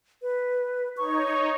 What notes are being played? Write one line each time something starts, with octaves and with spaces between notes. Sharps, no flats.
B4
D#4 C#5 C#6